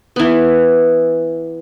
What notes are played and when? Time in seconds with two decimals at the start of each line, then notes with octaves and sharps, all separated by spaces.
0.16 E3 B3